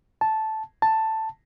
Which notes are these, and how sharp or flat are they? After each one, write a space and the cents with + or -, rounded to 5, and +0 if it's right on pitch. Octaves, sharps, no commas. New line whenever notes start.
A5 -10
A5 +5